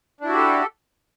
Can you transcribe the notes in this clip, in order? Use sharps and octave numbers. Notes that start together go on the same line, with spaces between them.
D4 E4 F#4 G4 A4